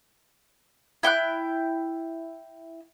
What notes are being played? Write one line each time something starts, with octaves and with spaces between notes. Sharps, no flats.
E4 G5 C#6 F#6